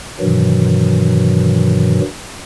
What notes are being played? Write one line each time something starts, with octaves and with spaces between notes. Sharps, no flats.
G2 B2 D#3 E3 F#3